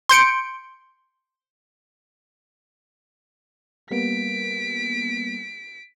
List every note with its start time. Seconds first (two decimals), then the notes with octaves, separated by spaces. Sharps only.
0.09 C6 G6 C#7 D7
3.91 G3 A#3 B3 B6 D7